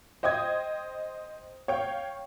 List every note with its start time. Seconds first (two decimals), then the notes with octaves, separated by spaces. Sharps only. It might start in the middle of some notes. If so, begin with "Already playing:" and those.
0.23 C5 D#5 G5 D#6 G#6
1.68 C#5 F5 G5